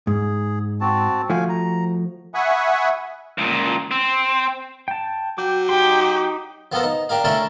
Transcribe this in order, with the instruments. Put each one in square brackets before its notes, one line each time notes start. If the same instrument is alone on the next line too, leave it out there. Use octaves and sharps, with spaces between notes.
[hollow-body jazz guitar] G#2 [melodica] G#4
[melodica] C4 F#4 A5
[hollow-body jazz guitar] F3 A3 F#4 [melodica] F5 G#5
[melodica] A#5
[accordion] E5 F#5 G#5 B5 C#6 D#6
[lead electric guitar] C#2 A#2
C4
[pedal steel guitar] G5 A5
[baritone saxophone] F#3 [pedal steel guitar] G5 D6
[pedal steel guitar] D#4 C6 [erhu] G4
[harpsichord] F3 B3 A4 A#4 C5
D#4
D4 G4 A#4 F5
A3 C#4 D4 E4 A4 A#4